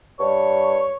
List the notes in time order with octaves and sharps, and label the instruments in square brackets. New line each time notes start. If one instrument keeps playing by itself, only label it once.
[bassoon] G2 [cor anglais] C#5